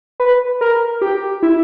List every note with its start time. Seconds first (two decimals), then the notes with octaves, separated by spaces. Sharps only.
0.20 B4
0.61 A#4
1.02 G4
1.43 E4